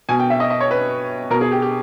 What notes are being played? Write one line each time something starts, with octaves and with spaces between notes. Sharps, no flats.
B2 G#5
G5
E5
D#5
D#5
C#5
B4
B2 A#4
G#4
G4
G4